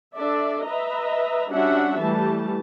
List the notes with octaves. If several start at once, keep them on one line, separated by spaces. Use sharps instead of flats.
D4 A4 D5 E5
B4 D#5 E5 A#5
G3 C#4 D4 F#4 E5 F#5
E3 G3 A3 A5